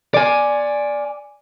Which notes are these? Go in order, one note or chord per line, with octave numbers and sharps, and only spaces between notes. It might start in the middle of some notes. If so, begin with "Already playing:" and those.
D5 G#5